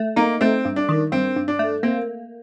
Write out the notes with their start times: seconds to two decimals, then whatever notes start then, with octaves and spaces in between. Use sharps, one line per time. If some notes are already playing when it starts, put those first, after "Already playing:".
Already playing: A3
0.16 A#3 D#4
0.41 A3 C4
0.65 G2
0.76 D4
0.89 D#3
1.12 G2 C4
1.36 G2
1.48 D4
1.59 A3
1.83 A#3 C4